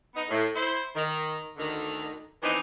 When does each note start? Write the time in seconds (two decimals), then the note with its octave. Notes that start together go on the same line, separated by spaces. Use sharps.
0.15 B3 D#4
0.29 A2
0.54 E4 C5
0.95 D#3
1.57 D2 D3 D#3
2.41 D#3 E3 B3 C4 D4 D#4